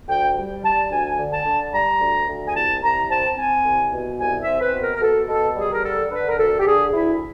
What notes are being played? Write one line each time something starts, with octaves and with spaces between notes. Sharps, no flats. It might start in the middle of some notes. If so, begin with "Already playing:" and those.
D2 G5
G3
G3 A5
A5
D2 G#5
D3
A5
D3
G3 A#5
D2
D2
G#5
C2 A5
C2 A#5
C4 A5
C4 G#5
C2
B2
C2 G#5
E5
C4
B4
B2
A#4
A#4
B2 A4
B2 A4
G3 G#4
A#4
D3 A4
D3 B4
A#4
D2 A4
G4
D3 G#4
D2 E4